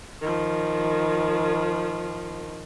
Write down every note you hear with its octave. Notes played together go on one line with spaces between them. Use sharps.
D#3 F3